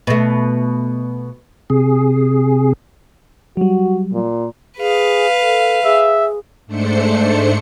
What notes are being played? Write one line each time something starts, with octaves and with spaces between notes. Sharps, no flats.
B2 A3
C3 G#4
F#3 G3 F#4
A#2
G#4 B4 F5
A4
G#4 E5
G#2 A3 D4 C5 C#7